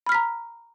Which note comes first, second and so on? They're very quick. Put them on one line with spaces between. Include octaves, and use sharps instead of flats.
B5 F6 B6 A#5